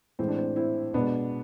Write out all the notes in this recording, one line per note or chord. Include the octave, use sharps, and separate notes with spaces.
A2 E3 G#3 C4
D4
C4
C4 E4
B2 G#3 B3 D4